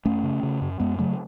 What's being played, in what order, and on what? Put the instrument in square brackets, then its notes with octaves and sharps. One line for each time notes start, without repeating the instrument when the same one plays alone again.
[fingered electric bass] F#2 A3 C#4
C#3
C#3
F#2
F#2 G#3 B3
C#3 F#3 A3